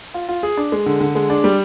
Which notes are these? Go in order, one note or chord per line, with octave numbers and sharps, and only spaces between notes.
F4
F4
G#4
D4
G#3
D3
D3
G#3
D4
G3